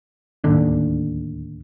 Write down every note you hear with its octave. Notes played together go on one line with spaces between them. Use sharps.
D1 D#2 D3 D4